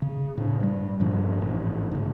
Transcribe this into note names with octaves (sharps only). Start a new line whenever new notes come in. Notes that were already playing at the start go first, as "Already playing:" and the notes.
C#3
A2 D4
G2 G3
G2 A#2 F3 D4
A1 G#2
G#2 C#3